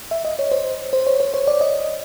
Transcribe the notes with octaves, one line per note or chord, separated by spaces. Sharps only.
E5
D#5
C#5
C5
C5
C#5
C5
C#5
D5
D#5